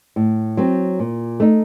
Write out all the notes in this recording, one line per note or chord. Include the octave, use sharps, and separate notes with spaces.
A2
F#3 C4
A#2
A3 D#4